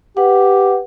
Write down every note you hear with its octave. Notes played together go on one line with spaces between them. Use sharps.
G4 B4 F#5